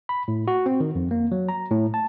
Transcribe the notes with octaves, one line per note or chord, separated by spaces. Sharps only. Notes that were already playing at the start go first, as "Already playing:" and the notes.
B5
A2
F#4
C4
D#3
F2
A#3
F#3
A#5
A2
A5